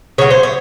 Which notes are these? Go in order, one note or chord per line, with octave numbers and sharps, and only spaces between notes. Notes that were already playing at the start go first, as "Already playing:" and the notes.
C#3 F#3 C#5
C5
C#5